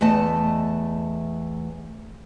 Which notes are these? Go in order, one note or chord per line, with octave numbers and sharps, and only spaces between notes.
E2 A3 D#5 A5